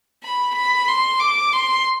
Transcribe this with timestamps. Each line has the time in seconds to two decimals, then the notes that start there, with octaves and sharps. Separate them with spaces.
0.23 B5
0.56 B5
0.88 C6
1.20 D6
1.53 C6